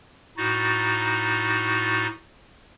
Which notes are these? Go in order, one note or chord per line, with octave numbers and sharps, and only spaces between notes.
A2 D#4 F#4 A6